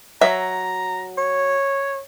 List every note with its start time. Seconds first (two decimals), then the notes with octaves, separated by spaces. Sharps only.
0.21 F#3 E5 A#5
1.18 C#5